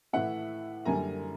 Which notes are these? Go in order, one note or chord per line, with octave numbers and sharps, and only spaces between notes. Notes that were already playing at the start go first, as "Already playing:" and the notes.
A2 E3 A3 E5 F#5
F#2 D3 G3 A#3 G#5 A#5